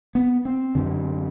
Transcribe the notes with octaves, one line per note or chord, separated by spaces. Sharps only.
B3
C4
F#2 D3